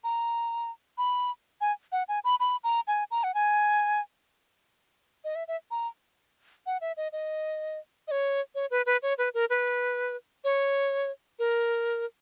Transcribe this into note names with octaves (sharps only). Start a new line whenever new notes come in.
A#5
B5
G#5
F#5
G#5
B5
B5
A#5
G#5
A#5
F#5
G#5
D#5
E5
E5
A#5
F#5
E5
D#5
D#5
D#5
C#5
C#5
B4
B4
C#5
B4
A#4
B4
C#5
A#4